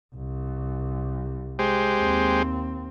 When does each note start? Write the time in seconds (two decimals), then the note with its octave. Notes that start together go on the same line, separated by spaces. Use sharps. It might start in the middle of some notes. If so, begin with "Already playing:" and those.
0.16 C2
1.59 G#3 G4 C5
1.99 D#2 C4